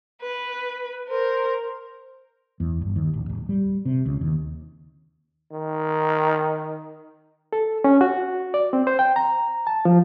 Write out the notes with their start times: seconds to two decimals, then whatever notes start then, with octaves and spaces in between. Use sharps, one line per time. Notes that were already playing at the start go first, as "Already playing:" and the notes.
0.21 B4
1.10 A#4 C5
2.60 E2
2.81 G1
2.96 D#2
3.14 A1
3.30 D1
3.49 G3
3.85 C3
4.06 C#2
4.21 D#2
5.52 D#3
7.53 A4
7.84 C#4
8.01 F#4
8.54 D5
8.73 C4
8.87 C5
8.99 G5
9.16 A#5
9.67 A5
9.85 F3